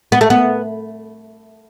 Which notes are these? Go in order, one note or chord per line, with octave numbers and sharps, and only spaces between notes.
B3
A3
B3